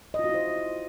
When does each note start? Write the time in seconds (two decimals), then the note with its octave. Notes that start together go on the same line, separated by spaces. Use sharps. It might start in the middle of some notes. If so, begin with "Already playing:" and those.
0.14 D#5
0.19 F4
0.24 F#4
0.29 E4
0.34 C5